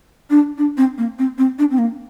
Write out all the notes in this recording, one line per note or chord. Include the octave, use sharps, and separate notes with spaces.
D4
D4
C4
A#3
C4
C4
D4
C4
A#3